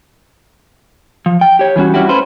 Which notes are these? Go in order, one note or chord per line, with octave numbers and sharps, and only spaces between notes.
F3
G5
G4 C#5
E3 G3 C#4 F#4
G3 C#4 E4 F#4 G4
A3 C#4 B4 C5